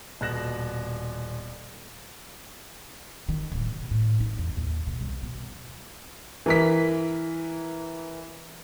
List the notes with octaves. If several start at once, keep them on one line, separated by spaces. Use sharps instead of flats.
D#1 B2 F#6 A#6 E7
D#3
D1
B2
A2
D#4
E2
D#2
B2
C2
B2
E3 A#4 B6